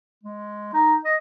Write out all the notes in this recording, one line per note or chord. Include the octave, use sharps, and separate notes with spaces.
G#3
D#4
D#5